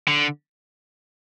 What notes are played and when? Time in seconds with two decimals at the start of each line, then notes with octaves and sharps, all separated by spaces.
0.08 D3